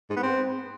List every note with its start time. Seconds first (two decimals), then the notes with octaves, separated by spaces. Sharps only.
0.10 G#2
0.16 B3
0.23 C4